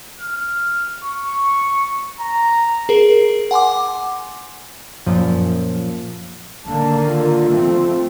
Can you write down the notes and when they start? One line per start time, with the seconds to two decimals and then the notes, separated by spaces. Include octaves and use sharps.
0.20 F6
1.04 C#6
2.20 A#5
2.89 G#4 A#4
3.51 F#5 G#5 C6 D6
5.06 F#2 A#2 F3
6.65 D3 D#3 A#3 A5
7.07 F4
7.50 F3 A3 C4